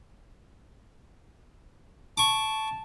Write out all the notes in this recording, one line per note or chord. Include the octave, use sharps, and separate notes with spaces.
A5 C#6 D6